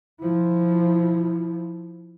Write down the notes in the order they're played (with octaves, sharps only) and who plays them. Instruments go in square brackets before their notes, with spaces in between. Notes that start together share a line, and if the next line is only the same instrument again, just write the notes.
[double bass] F3 E4